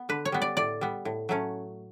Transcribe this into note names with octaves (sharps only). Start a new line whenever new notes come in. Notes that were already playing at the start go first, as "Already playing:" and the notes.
Already playing: B3
D3 B4
C#5
G3 B3
D5
A2 D5
G3 B3
A2
F#3 A3 C#4